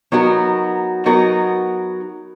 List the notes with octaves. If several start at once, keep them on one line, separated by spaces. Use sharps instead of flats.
F#3 B3 D#4 F#4 A#4
F#3 B3 D#4 F#4 A#4